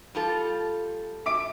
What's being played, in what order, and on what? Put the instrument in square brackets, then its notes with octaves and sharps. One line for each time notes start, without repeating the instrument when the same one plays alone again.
[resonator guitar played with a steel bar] G3 F4 A4
[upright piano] E5 D6 D7